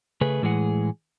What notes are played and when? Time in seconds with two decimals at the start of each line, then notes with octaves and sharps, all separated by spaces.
0.21 C#3 A3 G#4 B4
0.42 A2 E3 G#3 G#4 F#5